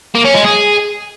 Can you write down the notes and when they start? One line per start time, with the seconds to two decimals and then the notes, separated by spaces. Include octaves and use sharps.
0.15 A#3
0.25 C#4
0.35 G#3
0.45 G#4